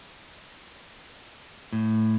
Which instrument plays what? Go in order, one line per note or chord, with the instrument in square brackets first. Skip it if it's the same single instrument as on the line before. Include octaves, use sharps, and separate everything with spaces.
[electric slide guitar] A2